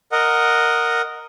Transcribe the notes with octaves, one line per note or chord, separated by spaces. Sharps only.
A#4 D#5 F#5